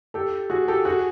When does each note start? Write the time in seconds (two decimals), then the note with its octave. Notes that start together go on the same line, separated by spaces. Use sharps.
0.14 G4 A4
0.50 F#4 G#4
0.68 G4 A4
0.85 F#4 G#4